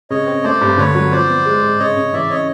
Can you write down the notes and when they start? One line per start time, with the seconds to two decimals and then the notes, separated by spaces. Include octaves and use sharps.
0.10 C#3 C#5 D#5
0.27 C4
0.44 A3 C5 D5
0.61 G2
0.78 D3 B4 C#5
0.95 F#3
1.12 F3 C5 D5
1.29 B3
1.45 G#3
1.62 G#2
1.79 C#3 C#5 D#5
1.96 C#3
2.13 E3 D5 E5
2.30 C#4 C#5 D#5